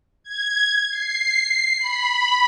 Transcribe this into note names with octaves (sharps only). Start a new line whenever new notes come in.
G#6
C7
B5